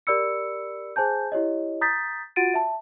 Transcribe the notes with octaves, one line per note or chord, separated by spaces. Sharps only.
G4 A#4 D5 B5 E6 C#7
G#4 C5 G#5 A5 G6
E4 G4 C#5 D#5
A#5 D#6 G6 A6 B6
F4 F#4 F#5 A6 D7 D#7
E5 A5